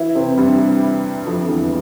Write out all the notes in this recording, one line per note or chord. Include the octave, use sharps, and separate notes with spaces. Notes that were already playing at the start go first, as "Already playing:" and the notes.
Already playing: E3 E4
C3 C4
G2 G3
F2 F3
D3
E2 E3